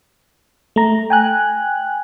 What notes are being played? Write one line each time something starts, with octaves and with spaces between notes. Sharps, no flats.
A3 A#5
G5 G#5 F#6